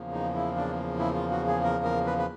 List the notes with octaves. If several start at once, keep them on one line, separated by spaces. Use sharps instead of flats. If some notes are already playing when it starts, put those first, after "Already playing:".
Already playing: E2 C#3 F3 A#3
D#4
E4
D4
E4
F4
F#4
G#4
A#4
A#4
B4
B4